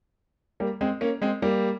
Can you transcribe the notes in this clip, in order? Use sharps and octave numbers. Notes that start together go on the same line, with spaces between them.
G3 A#3
G#3 C4
A#3 C#4
G#3 C4
G3 A#3